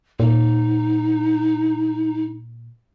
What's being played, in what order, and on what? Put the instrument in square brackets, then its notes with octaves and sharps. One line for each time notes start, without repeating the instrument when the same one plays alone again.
[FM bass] A#2 [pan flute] D#4